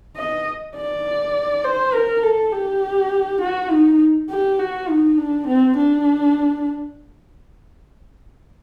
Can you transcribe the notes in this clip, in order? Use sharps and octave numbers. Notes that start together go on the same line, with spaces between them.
D#5
D5
C5
A#4
A4
G4
F#4
D#4
G4
F#4
D#4
D4
C4
D4